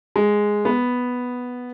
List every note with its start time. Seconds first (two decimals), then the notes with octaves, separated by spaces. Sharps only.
0.16 G#3
0.65 B3